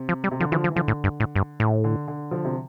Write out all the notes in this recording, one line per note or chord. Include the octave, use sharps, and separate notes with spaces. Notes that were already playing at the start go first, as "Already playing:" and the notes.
Already playing: C3
F3
G3
C3
D3 F3
D3 E3 F3
F3
E3
D3 F3
A2
G2
A2
G2
A2
D3
D3
D3 F3
C3